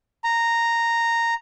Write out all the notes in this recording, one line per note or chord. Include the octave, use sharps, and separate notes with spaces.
A#5